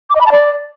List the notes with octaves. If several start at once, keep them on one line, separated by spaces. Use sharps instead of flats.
D6
D#5
B5
A5
D5